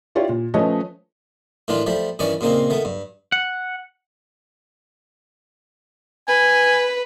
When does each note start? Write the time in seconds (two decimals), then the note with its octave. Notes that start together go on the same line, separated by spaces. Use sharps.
0.15 E4 F4 G4 C#5 D5
0.29 A#2
0.54 F3 A3 C#4 B4 C#5 D#5
1.68 A2 D#3 E3 D4 F4
1.87 F3 G3 A3
2.19 G2 D#3 E3 C#4 D5 C#6
2.41 A#2 C#3 A#3 C4 D#4
2.70 D#3 A3 B3
2.85 G2
3.32 F#5
6.28 B4 G#5